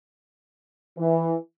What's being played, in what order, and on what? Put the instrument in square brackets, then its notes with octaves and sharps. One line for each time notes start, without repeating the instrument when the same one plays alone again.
[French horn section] E3